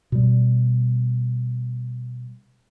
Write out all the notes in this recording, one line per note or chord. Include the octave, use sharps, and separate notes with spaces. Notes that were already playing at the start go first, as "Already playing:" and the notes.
B2 G3